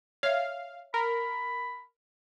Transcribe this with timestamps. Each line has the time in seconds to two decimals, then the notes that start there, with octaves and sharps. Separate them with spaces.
0.23 C#5 E5 F5
0.94 A#4 B5